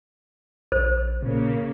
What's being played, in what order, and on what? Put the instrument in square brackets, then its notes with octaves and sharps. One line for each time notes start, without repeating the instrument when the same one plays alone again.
[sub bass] A#1 [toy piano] C5
[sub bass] A#2 [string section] C#3 A#3